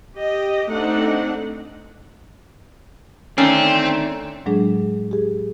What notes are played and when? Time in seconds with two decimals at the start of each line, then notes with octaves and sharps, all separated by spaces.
0.17 G4 D#5
0.69 A3 C4 D4 D#4 F#5
3.38 D3 D#3 A3 C4 C#4
4.46 A2 F#3 G#3 D4 G#4
5.11 G4 G#4